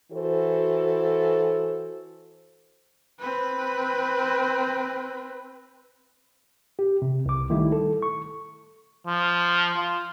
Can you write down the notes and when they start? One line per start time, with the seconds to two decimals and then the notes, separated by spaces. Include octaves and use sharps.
0.12 E3 F#4 A4 C5
3.20 C4 B4
6.79 G4
7.02 C3
7.26 C2 D6
7.50 D#3 G3 A3 E4
7.72 A4
8.02 C#6
9.06 F3
9.76 F4